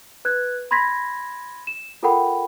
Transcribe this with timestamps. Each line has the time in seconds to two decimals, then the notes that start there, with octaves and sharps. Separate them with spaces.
0.25 B4 F#6 G#6
0.71 B5 C6 G#6 A#6 B6
1.67 E7
2.03 F4 A4 A#4 F#5 G5 B5